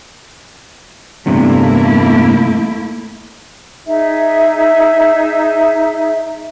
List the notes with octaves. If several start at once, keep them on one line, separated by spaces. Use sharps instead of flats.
E2 G2 C3 A3 A#3 E4
D#4 G#4 E5